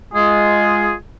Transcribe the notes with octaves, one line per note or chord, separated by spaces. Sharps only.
G#3 F4 G#4